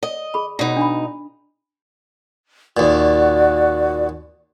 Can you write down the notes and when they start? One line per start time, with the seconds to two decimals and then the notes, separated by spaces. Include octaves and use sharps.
0.03 D#5
0.34 G#4 B5
0.59 B2 D#4
0.77 D4 B5
2.77 D#2 A#2 F#4 D5